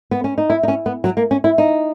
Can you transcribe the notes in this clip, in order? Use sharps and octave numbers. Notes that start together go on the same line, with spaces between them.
B3
C#4
D#4
E4
D#4
C#4
B3
F#3
A#3
C#4
E4
D#4